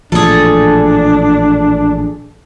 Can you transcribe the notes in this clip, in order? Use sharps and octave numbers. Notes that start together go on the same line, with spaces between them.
A1 A#2 F3 D4 G#4 A4